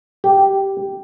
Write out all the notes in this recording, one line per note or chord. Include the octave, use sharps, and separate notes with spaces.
G4